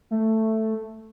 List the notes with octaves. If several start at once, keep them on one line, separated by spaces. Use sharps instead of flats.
A3